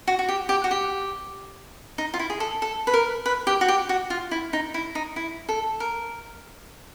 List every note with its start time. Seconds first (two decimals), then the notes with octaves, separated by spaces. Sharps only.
0.07 F#4
0.19 F#4
0.29 G4
0.49 G4
0.64 F#4
0.71 G4
1.98 D#4
2.14 F4
2.19 E4
2.30 G#4
2.40 A4
2.62 A4
2.87 B4
2.94 A#4
3.26 B4
3.47 G4
3.61 F#4
3.68 G4
3.89 F#4
4.10 F4
4.31 E4
4.53 D#4
4.74 E4
4.95 D#4
5.16 E4
5.49 A4
5.80 A#4